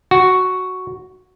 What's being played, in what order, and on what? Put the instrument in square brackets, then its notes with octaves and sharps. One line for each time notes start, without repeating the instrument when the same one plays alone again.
[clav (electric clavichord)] F#4